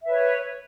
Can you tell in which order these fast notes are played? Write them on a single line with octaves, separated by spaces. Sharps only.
E5 B4 C#5